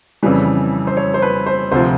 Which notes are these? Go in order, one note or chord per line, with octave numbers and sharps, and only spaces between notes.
F2 C#3 E3 G3 B4
C5
C#5
C5
B4
C5
D2 C3 F3 C5